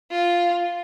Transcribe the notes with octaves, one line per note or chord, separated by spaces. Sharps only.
F4